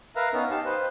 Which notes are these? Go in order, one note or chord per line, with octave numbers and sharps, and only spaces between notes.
A#4 B4 E5 F5 A#5
B3 C#4 D#4
D#4 G4 F5 A5
B4 C5